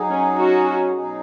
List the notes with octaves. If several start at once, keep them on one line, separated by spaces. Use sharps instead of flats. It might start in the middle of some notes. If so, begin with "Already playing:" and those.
Already playing: F#3 D#4 G#4
C#4
C#4 F#4
B2 F#3 D#4 G#4